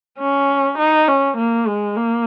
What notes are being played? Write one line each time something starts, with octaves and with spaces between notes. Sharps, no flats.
C#4
D#4
C#4
A#3
G#3
A#3